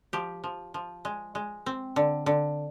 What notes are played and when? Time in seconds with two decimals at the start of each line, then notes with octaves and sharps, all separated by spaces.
0.13 F3 G4
0.44 F3
0.74 F3
1.05 G#3
1.35 G#3
1.66 C4
1.96 D3
2.26 D3